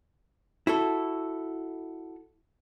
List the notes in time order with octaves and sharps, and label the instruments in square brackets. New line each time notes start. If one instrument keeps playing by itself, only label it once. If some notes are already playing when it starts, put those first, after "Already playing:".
[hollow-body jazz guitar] E4 F#4 A4